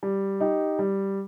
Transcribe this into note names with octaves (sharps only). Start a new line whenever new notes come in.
G3
D#4 G4
G3